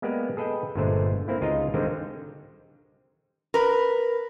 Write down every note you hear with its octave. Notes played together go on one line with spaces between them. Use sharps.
G#3 A#3 B3 G4 D5
G#4 A4 B4 D#5 G5
G1 A#2 D3 G#3 A3 C5
A#3 C4 E4
C#2 D#4 F4 G#4 D#5 A#5
D3 D#3 G3 G#3 C4 D#4
A#4 B4